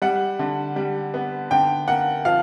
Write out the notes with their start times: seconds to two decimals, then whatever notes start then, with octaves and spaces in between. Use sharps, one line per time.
0.02 G3 F#5
0.39 D3
0.76 G3
1.14 B3
1.51 D3 G5
1.88 A#3 F#5
2.25 F3 F5